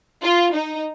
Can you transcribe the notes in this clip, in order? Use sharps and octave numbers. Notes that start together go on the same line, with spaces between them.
F4
D#4